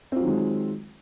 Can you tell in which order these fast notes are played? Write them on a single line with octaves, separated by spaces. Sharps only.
C4 F4 F#3 D#3 G#3